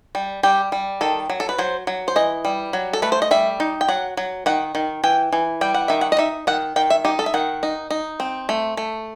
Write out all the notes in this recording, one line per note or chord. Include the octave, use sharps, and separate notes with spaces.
G3
G3 G4
G3
D#3 A4
F#3
A4
B4
F#3 C5
F#3
C5
E3 D#5
G3
F#3
A4
A3 B4
C5
D#5
G3 E5
D#4
G5
F#3 F#5
F#3
D#3 F#5
D#3
E3 G5
E3
G3 G5
F#5
D#3 E5
F#5
D#5
D#4 E5
D#3 F#5
D#3 G5
E5
D#4 G4
A4
E5
D#3 F#5
D#4
D#4
C4
A3
A3